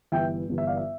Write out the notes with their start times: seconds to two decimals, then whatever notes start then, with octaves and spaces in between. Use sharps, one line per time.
0.12 G1 G2 E3 E5 G5
0.49 G1 G2 E3
0.58 E5
0.67 D5 F5
0.77 E5